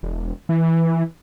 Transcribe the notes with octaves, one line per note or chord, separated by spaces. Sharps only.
E1
E3